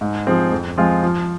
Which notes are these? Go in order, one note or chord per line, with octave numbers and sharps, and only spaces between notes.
G#2
F3 C4 G#4
F2
F3 G#3 C4 F4
F3